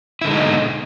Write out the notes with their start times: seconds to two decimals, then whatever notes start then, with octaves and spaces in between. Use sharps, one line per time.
0.21 E4
0.25 D3
0.28 G#3
0.31 D#4
0.34 B2